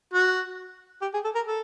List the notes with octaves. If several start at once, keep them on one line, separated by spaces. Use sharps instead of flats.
F#4
G4
G#4
A4
A#4
A4